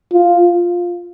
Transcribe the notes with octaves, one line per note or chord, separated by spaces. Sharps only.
F4